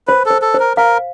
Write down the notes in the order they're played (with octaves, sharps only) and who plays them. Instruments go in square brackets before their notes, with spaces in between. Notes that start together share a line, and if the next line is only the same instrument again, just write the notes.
[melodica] B4 [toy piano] C5
[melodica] A4 [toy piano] C5
[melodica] A4
[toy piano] C5
[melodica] A#4
[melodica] A#4 [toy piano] F5